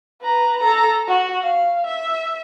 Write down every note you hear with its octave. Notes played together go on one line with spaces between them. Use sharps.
B4 A#5
A4 A#5
F#4
F5
E5